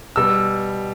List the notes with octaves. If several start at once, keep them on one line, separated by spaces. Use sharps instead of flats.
B2 G3 E6